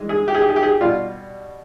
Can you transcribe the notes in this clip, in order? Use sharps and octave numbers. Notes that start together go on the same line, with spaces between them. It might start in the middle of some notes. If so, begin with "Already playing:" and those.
Already playing: G2 E3 G#3
G#4
G4
G#4
G4
G#4
G4
G#4
G4
B2 G3 F4